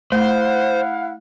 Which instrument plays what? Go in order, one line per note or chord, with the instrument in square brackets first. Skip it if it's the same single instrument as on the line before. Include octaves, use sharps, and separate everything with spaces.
[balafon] A3 [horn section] E4 F5 F#5 [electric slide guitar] C5